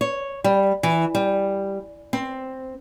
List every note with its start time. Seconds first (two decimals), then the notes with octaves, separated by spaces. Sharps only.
0.01 C#5
0.44 G3
0.83 E3
1.15 G3
2.13 C4